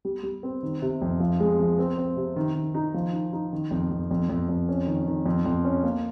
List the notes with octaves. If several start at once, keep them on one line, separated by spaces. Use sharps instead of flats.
G3
G3
C4
D#3
C3
F2
F3
G#3
F3
C4
C4
C3
D#3
D#3
D#4
F3
D#4
D#4
D#3
F2
F2
F2
F2
F2
C#4
D#3
D#3
F2
F2
C#4
A#3